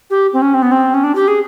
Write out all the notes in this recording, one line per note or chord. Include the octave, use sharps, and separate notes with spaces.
G4
C4
C#4
C4
B3
C4
C#4
D4
G4
G#4